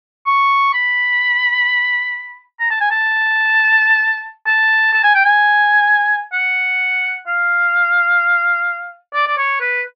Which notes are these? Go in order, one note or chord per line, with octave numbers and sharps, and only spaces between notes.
C#6
B5
A#5
A5
G#5
A5
A5
A5
G#5
G5
G#5
F#5
F5
D5
D5
C#5
B4